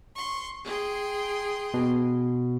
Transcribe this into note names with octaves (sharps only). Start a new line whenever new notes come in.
C6 C#6
G#4 G5 C6
B2